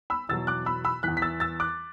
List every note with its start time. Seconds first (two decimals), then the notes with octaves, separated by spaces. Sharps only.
0.10 B5 E6
0.29 E2 B2 F#3 E6 A6
0.47 D6 F#6
0.66 B5 E6
0.85 B5 E6
1.03 E3 F#6 B6
1.08 E2
1.17 B6
1.22 E6 A6
1.40 E6 A6
1.60 D6 F#6